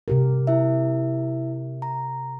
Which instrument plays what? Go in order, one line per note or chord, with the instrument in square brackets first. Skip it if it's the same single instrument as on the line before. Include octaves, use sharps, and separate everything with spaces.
[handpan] C3 G4 A#4
[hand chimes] E4 E5
A#5